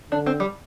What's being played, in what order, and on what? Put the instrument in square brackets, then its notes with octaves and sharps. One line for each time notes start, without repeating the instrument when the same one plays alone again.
[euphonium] D3 [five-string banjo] D4
[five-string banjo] C4
G3